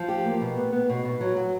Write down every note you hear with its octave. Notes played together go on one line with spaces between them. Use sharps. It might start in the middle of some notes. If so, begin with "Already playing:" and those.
Already playing: F3
G4
A#3
B2
B3
B3
B2
B2
F#3
F#3